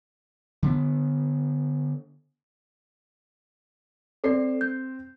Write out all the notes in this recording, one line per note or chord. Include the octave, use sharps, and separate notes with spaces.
D3 B3
C4 A4 D5 C7
G6